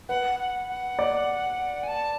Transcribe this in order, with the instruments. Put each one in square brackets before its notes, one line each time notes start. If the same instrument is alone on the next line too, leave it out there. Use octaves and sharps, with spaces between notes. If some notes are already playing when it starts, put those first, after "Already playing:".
[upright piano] B4 [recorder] F#5
[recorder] F#5
F#5
[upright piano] D5
[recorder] G#5
A5